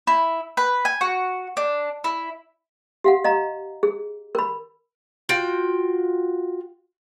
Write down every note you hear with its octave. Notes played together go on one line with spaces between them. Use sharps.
E4
B4
G#5
F#4
D4
E4
G4 F5 F#5
D#5 F5 A#5
G#4
A#4 B5
F4 F#4 G5